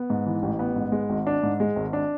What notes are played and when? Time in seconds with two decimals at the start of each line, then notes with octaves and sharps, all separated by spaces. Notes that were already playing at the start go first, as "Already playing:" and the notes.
Already playing: B3
0.10 G#2
0.26 E3
0.43 A1
0.59 B3
0.76 G#2
0.92 G#3
1.10 G#1
1.27 D4
1.43 G#2
1.60 G#3
1.76 G#1
1.93 D4